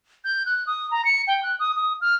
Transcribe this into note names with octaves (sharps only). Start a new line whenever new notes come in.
G6
F#6
D#6
A#5
C#7
G5
F#6
D#6
D#6
F6